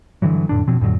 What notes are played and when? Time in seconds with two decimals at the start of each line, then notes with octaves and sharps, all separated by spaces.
0.22 G2 D3 E3 F#3
0.49 F2 A2 D4
0.67 B2 F3 C4
0.81 F2 A2 D3 F#3